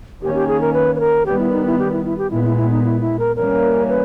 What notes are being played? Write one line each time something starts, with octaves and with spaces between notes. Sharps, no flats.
D#3 A#3 C#4 G4
G4
G#4
A#4
B4
B4
A#4
D#3 G3 B3 G4
E4
D#4
E4
G4
E4
E4
G4
A#2 G#3 B3 E4
E4
E4
D#4
E4
E4
A#4
E3 G3 A#3 C#4 A#4
B4